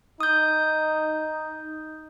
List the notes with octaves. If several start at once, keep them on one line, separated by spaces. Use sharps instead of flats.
D#4 D#6 G6